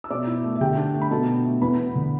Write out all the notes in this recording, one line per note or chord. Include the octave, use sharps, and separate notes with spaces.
E6
B2 D5 D6
E4
A3
E5
D3 G4 G5
D4
A3
B5
B2 A4 A5
D4
A3
E2 B4 B5
B3
D3